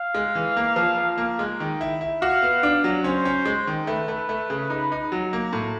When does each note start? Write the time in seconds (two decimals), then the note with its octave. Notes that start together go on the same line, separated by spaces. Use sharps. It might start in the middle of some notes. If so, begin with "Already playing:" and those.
Already playing: F5
0.15 G#3
0.35 E3
0.57 A#3
0.76 F3
0.98 F3
1.18 A#3
1.39 G#3
1.60 D#3
1.81 E4
2.01 E4
2.22 F#4 F5
2.42 B3
2.63 D4
2.84 F#3
3.04 C#4 C5
3.25 C#4
3.45 G#3
3.67 D#3
3.87 A3 B4
4.08 A3
4.29 A3
4.50 C#3
4.70 D#4
4.92 D#4
5.12 F#3
5.33 A#3
5.53 A2